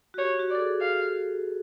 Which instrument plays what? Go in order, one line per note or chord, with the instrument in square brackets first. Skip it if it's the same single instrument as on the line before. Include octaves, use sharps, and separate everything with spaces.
[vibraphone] F#4
[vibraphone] G4 [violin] C#5
[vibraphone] F#4
[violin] D5
[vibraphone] A4
G#4
[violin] F5